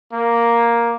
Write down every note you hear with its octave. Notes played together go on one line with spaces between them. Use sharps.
A#3